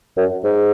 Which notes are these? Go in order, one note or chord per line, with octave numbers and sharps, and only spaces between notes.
F#2
G#2